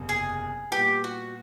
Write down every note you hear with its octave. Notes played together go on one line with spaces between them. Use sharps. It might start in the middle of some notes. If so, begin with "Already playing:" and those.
Already playing: F#1 E2 C3
G#4
A#2 G3 B3 G4
F#4